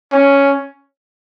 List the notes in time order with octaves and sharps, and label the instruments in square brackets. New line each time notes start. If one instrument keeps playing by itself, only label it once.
[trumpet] C#4